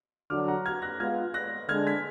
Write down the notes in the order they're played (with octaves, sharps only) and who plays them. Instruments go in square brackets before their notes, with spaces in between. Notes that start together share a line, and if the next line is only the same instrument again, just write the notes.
[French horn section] D3 F#3 D4 F#4 [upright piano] D6 F6
[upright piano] F#5 A#5
F6 G#6
F#6 A#6
[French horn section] G#3 B3 F4 [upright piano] F6 G#6
[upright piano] F#6 A#6
[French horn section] D3 G#3 D4 [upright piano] F6 G#6
[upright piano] G#6 B6